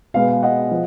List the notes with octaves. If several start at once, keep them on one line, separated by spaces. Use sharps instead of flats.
B2 G#3 B3 F5
F5
D#5 F#5
F3